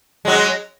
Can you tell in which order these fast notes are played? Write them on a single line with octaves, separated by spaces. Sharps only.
G#3 F#3 C#4